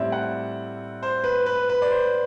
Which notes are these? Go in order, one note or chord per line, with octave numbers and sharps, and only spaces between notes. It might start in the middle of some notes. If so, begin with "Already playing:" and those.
Already playing: A2 G3 C4 D5 E5
F#5
C5
B4
B4
B4
D5
C5